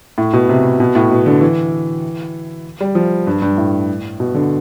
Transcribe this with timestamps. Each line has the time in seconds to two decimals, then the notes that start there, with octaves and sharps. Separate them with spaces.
0.18 A2
0.33 B2
0.49 C3
0.80 B2
0.95 A2
1.11 B2
1.26 D3
1.41 E3
2.81 G3
2.95 F3
3.27 G2
3.42 G2
3.57 A2
4.20 B2
4.35 D3